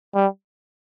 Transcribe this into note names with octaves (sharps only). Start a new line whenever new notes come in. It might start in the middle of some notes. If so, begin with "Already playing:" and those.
G3